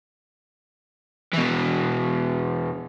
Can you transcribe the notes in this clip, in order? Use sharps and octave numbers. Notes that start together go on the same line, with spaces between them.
B2 E3